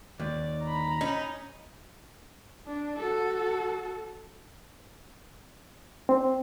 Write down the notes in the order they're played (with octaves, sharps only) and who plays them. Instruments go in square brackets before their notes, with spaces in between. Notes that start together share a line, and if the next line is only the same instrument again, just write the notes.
[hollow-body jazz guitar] D#2 [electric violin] D5
[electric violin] A#5 B5
[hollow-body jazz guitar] C#4 [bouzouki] D#4
[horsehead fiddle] D4
F#4 A4
[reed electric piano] C4